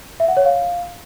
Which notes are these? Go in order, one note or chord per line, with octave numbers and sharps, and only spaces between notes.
E5
F#5
C#5
F5